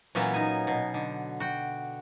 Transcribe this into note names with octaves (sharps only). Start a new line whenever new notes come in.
A#2 E3 F#3 B3 C#4 E5
D#4 G#5
B2
D3
F#4 G5